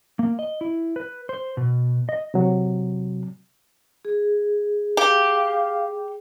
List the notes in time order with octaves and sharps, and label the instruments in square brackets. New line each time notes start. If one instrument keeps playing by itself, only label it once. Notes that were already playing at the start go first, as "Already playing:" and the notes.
[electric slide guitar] A#3
D#5
E4
B4
C5
B2
D#5
[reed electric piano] C3 F#3
[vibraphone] G#4
[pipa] G4 [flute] F5